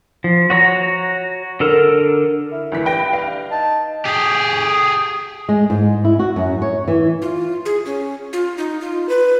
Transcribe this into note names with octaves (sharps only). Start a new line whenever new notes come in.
F3
F#4 C#5 A#5
D3 A4 A#4
E4
D2 E3 B6
G2 B4 G5 A#6
F5
D#4 A5
G4 G#4
G#3
G#2
E4
F#4
F#2
C#5
E3
F4
G#4
C#4
F4
D#4
F4
B4